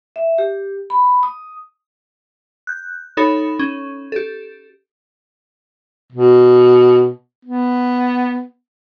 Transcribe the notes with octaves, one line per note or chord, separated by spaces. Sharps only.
E5
G4
B5
D#6
F#6 G6
D#4 A4 C#5 B5
C#4
G4 A4
B2
B3